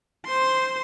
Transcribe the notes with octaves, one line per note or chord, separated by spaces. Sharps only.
C5 C6